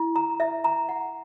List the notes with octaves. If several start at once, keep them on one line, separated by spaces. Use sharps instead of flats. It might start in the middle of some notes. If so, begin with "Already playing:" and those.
Already playing: E4
A#5
E5
A#5
F#5